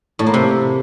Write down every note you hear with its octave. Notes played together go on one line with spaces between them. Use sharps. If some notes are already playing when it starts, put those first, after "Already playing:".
A2
A#3
C3